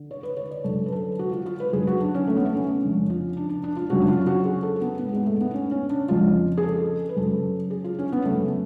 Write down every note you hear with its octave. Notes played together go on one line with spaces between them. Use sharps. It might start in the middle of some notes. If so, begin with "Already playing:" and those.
Already playing: D3
C#5
B4
C#5
D5
F#2 D3 A4
B4
A4
F#4
F4
F4
B4
F#2 D3 G#4
F#4
D4
C#4
A3
B3
A3
C#4
F2 C#3 D4
F4
D4
D4
D4
F4
F#2 C#3 F#4
D4
F4
F#4
G#4
A4
B3
G#2 B3
G#3
A3
B3
C#4
C#4
D4
F2 C#3 F4
G#4
A4
B4
F#2 C#3 A4
G#4
F4
C#4
B3
F#2 C#3 A3